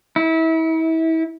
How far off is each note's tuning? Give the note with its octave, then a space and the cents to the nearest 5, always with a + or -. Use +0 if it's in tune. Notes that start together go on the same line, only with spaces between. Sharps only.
E4 -30